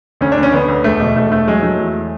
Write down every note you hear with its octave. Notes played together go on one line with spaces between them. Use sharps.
D2 C#4
D4
D2
C#4
D2 B3
D2
E1 A3
B2
E1 A3
E1 A3
F#3 G#3
F#3 A3
E2